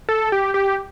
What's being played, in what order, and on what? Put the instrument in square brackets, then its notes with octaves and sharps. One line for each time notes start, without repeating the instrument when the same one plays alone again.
[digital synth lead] A4
G4
G4